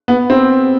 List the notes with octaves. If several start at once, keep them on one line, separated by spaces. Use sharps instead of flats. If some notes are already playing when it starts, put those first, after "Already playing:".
B3
C4